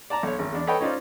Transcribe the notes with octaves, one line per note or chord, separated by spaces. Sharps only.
D5 A5 A#5
B1 C#5
G#1
E2 D4
A4 B4 C#5 D#5 G5
C#4 D#4 F4 C5 D5